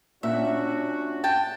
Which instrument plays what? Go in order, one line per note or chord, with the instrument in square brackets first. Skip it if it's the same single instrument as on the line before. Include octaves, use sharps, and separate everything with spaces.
[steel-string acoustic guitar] A#2 [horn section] C#4 D4 F#4 [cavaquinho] E5
[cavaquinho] G5 A5